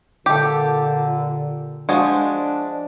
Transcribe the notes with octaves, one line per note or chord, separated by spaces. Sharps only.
A#2 D3 G4 A4
F3 G#3 D4 F#4